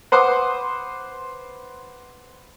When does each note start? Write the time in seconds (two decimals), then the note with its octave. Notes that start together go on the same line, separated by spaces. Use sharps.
0.12 B4 C5 F#5 C6 D6 D#6